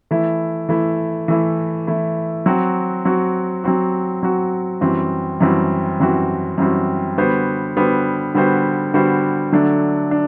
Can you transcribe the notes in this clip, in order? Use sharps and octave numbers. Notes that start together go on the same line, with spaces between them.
E3 A3 E4
E3 A3 E4
E3 A3 E4
E3 A3 E4
F#3 C4 F#4
F#3 C4 F#4
F#3 C4 F#4
F#3 C4 F#4
F#2 E3 G3 C4 F#4
F#2 E3 G3 C4 F#4
F#2 E3 G3 C4 F#4
F#2 E3 G3 C4 F#4
D3 G3 B3 F#4 C5
D3 G3 B3 F#4 C5
D3 G3 B3 F#4 C5
D3 G3 B3 F#4 C5
D3 F#3 A3 D4
D4